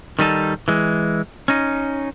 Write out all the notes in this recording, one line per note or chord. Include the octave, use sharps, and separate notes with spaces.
D#3 G3 D#4 A4
E3 G#3
C#4 D#4